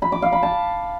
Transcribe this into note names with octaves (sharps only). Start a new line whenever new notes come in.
B5
D6
F5
B5
A5